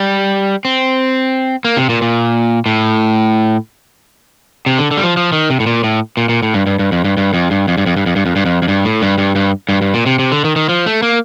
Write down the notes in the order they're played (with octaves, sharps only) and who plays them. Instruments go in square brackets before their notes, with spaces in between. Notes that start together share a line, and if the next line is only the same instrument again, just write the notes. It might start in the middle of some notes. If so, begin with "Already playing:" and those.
Already playing: [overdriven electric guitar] G3
C4
A#3
C3
A#2
A#2
A2
C3
D3
D3
G3
F3
F3
D#3
C3
A2
A#2
A2
A#2
A#2
A2
G2
G2
G2
F2
G2
G2
F2
G2
F2
G2
F2
G2
F2
G2
F2
G2
F2
F2
G2
A2
G2
G2
G2
G2
G2
A#2
C3
C3
D3
D#3
D#3
F3
A3
A#3